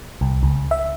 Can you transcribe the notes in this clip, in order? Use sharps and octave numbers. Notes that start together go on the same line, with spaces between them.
C2
C#2
E5